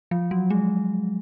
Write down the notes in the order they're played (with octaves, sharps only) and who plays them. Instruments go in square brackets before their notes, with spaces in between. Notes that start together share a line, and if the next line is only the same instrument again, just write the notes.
[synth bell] F3
F#3
G#3